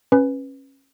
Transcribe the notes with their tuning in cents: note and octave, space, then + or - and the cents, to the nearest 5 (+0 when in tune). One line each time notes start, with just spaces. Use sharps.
C#4 -25 B4 +0